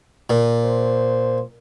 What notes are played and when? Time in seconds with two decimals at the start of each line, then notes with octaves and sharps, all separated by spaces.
0.30 A#2
0.64 C5